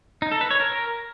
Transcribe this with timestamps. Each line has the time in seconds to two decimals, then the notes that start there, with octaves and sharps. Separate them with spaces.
0.22 D#4
0.32 A4
0.41 B4
0.51 C#5
0.60 A#4